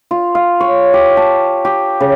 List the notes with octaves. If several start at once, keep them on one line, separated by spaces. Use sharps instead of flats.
F4
F5
C#5
G4
A5
G4
C#3